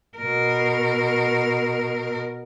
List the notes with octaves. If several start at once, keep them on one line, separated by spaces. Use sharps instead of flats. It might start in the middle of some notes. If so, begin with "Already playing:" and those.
B2 A#4